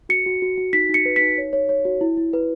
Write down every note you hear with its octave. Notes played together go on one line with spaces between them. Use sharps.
F#4 C#7
F#4
F#4
F#4
D#4 B6
D#4 C#7
B4
B6
D#4
C#5
C#5
C#5
F#4
E4
E4
B4